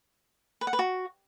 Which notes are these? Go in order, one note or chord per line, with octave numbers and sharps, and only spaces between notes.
B4
F#5
B4
F#4